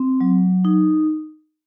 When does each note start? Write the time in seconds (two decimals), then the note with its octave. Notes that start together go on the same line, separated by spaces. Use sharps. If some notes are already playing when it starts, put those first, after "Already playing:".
Already playing: C4
0.21 F#3
0.65 D#4